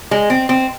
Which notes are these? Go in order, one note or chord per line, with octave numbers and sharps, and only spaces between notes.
G#3
C4
C4